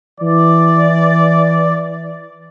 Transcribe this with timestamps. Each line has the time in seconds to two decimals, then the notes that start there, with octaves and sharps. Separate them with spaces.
0.21 E3 D5